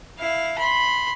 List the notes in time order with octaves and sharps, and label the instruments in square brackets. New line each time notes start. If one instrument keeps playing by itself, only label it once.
[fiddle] E4 F5
B5 C6